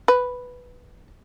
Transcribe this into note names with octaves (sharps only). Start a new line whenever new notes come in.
B4